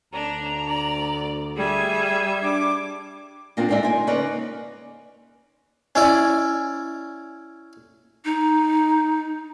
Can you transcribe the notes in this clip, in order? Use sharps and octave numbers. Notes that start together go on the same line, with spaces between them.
D2 D4 A#5
D5
G3 G#4 E5 G#6
D4 D6
A#2 A#3 C4 D4 F4
D2 G#3 D#4 D5 E5
C5 G#5
C#3 A#3 D#4 B4 C#5 D5
C#4 E4 D5
D#4